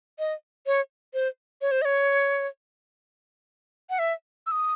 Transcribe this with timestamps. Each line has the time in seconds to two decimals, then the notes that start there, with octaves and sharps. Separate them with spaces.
0.19 D#5
0.66 C#5
1.14 C5
1.62 C#5
1.71 C5
1.82 D#5
1.85 C#5
3.90 F#5
3.99 E5
4.47 E6
4.51 D#6